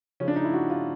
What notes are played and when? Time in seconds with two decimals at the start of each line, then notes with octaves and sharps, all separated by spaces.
0.20 C#3 F3 C#4
0.28 D4
0.36 D#4
0.44 E4
0.54 F#4
0.70 F4